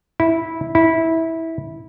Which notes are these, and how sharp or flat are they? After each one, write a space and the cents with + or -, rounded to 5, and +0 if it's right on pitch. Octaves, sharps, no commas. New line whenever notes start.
E4 -10
E4 -15